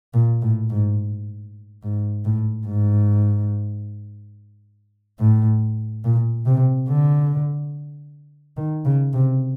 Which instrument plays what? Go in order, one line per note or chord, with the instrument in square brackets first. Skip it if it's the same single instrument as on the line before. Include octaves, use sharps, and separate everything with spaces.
[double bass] A#2
A2
G#2
G#2
A2
G#2
A2
A#2
C3
D3
D#3
C#3
C3